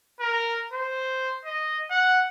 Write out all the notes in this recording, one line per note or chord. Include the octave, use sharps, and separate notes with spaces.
A#4
C5
D#5
F#5